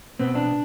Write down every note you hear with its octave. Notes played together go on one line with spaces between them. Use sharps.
B2 B3 C4
D4